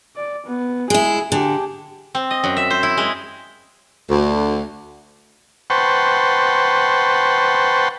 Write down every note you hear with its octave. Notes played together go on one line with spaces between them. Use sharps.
D5
B3
G#3 E4 G#4
D3 G4 G#4
C4
D#5
F#2
E5
C5
E4
G#3
D2
B4 C5 F#5 G5 A5 C#6